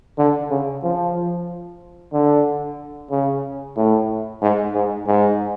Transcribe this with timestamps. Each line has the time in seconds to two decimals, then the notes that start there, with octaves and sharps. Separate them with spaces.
0.18 D3
0.50 C#3
0.84 F3
2.13 D3
3.11 C#3
3.77 A2
4.42 G#2
4.74 G#2
5.07 G#2